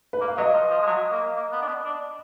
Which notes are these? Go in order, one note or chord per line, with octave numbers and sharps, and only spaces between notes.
B4
A#3
F5
F#3 D#5
F3
F3
G#3
F#3
A#3
A#3
B3
D4
B3
D4